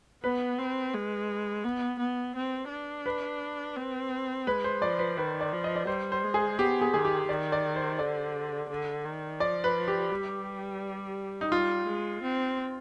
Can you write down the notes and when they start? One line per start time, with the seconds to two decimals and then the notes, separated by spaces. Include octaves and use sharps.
0.24 B3 B4
0.58 C4
0.94 G#3
1.64 B3
1.99 B3
2.35 C4
2.70 D4
3.06 B4
3.76 C4
4.47 G#3 B4
4.64 C5
4.81 F3 D5
4.99 B4
5.17 D#3 B4
5.41 D5
5.53 F3
5.64 D#5
5.76 D5
5.87 G3 C5
6.12 C5
6.23 G#3
6.34 G#4
6.59 B3 G4
6.81 G#4
6.94 D#3 G#4
7.05 G4
7.28 D#3 D5
7.52 D5
7.76 C5
7.99 D3 D5
8.69 D3
9.05 D#3
9.40 F3 D5
9.64 B4
9.88 G4
10.11 G3
11.41 D#4
11.52 G3 F4
11.87 G#3
12.23 C4